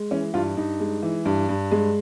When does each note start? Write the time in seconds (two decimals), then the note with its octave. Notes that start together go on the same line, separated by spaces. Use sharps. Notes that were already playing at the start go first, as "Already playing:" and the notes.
Already playing: G#3
0.11 E3 C#4
0.34 G2 F4
0.57 G2 D#4
0.80 G#3
1.03 E3
1.25 G2
1.49 G2
1.71 G#3